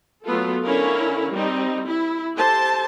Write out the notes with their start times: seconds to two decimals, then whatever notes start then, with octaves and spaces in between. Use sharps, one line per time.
0.25 F#3 A3 B3 F4 A4
0.64 D3 C#4 E4 A#4 C#5 F5
1.32 G3 C4 D#4
1.86 E4
2.37 G4 A4 C5 A5